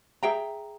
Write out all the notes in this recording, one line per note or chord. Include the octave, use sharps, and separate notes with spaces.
G#4 E5 G5 A#5